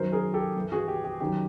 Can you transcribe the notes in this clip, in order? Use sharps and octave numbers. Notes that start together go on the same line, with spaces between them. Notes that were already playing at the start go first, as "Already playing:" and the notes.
Already playing: F#2 D#3 F#3 A#4 C5
G#4 A#4
G4 A4
G2 E3
F#4 G#4
G4
G4
F#2 D#3 F#3 G4